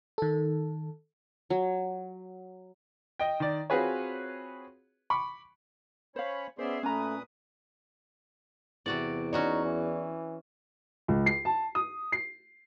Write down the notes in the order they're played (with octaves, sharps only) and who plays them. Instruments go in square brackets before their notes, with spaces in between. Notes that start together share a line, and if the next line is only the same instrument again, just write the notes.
[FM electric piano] D#3 A4
[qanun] F#3
[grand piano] D#5 G5
D#3 D5
C4 F4 F#4 G#4 B4 C#5
B5 C#6 D6
[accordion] C#4 C#5 B5 [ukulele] C5 F5
[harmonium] B3 C#4 D5 [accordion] G#4 E5 C6 [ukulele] C5
[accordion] A#2 B4 D#6 [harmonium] A3 [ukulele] C#4 A#5
[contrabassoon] E2 [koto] C3 F#4 D5
[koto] C#4 F#4 C#5 [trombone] D#4 [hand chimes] D5
[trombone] E3
[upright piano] C#2
C7
A5
D#6
C7